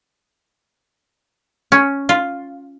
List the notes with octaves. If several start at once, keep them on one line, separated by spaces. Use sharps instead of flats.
C#4
F4